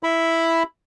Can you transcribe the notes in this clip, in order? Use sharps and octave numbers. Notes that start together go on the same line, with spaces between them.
E4 B5